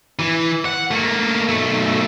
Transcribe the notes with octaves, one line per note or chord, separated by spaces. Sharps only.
E3
F#5
A3 A#3
B1 A3